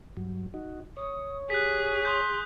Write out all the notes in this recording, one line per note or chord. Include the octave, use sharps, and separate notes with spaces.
G2 F#3
D#4 F#4
C#5 D#6
G4 G#4 F#6 B6
C6 D#6 G6